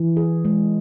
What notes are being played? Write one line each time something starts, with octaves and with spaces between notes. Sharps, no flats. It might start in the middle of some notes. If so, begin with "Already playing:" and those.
Already playing: E3
G#4
G#3